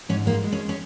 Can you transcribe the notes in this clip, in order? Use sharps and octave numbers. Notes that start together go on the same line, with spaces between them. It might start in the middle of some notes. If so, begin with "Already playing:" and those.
G#2 C#4
G#3 A#3
G#3
C#4
C#4